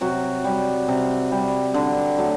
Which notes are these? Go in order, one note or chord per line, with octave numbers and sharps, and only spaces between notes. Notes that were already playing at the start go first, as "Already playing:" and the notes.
C3 F#3 F#4
G3
C3
G3
D3
F#3 A3